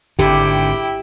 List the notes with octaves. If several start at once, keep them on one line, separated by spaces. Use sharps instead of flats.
G#1 D3 E4 G4 G5